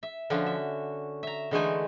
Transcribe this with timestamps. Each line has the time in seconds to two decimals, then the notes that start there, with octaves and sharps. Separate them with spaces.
0.03 E5
0.30 D3 F3 C#4 F#4
0.46 E5
1.23 E5 A#5
1.51 D3 E3 G#3 A3 D#4 G#5